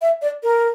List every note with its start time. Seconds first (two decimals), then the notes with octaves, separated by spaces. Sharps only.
0.02 E5
0.22 D5
0.43 A#4